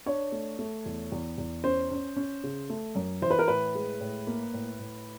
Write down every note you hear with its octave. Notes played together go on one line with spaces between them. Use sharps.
D4 C#5
A3
A3
E2
E2
E2
C#4 C5
C#4
C#4
C#3
A3
F#2
E3 C5
B4
A#4
A2 B4
G#3
A2
A#3
A2
A2